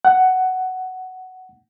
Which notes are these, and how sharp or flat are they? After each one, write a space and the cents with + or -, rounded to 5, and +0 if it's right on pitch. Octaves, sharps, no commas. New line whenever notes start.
F#5 +10